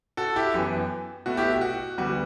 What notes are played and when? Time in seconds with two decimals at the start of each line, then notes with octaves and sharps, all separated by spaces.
0.17 F#4 A4
0.36 E4 G4
0.54 F#2 E3 B3
1.26 B2 A3 F#4
1.37 E4 G4
1.61 F#4
1.98 D2 D3 G3 B3 F#4